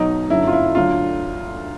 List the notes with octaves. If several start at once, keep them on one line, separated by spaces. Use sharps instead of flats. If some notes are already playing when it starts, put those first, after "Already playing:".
Already playing: B1 B2 F#3 D#4
G1 F#2 D3 F#3 E4
F4
E4
D2 D3 F#3 F4